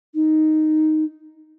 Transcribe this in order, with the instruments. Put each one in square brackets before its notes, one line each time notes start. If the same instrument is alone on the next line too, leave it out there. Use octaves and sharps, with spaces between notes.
[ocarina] D#4